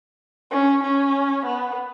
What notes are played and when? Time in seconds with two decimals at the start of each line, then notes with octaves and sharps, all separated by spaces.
0.51 C#4
0.83 C#4
1.46 B3